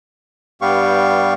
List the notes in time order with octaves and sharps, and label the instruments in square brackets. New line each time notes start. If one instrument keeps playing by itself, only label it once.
[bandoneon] G2 G3 B3 G4 F5 C#6